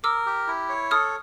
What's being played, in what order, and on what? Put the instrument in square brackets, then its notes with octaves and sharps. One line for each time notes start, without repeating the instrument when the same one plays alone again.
[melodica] A#4 [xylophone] D6 E6
[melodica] G4
E4
C#5
[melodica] A4 [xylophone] D#6 F6